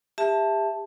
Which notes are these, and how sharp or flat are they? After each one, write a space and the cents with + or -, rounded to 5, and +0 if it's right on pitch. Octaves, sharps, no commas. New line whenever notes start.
G4 +35 E5 +0 A5 +0